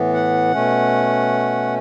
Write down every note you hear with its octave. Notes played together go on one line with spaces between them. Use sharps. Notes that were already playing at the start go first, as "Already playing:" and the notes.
Already playing: A2 E3 B3
F#5
B2 A3 C#4